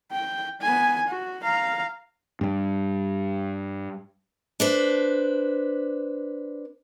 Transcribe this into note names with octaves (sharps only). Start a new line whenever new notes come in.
G5
B3 G#5
F#4
F5 A#5
G2 G3
D4 B4 C5